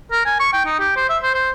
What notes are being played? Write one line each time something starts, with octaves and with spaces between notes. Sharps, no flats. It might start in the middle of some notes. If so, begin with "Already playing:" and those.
A#4
G#5
C#6
G5
D#4
G4
C5
E5
C5
C5